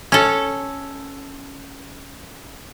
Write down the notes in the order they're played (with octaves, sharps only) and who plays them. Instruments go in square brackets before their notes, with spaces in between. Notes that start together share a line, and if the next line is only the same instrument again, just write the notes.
[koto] C#4 A4